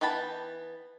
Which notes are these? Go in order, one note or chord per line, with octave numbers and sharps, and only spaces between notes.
E3 B3 G5 A5 B5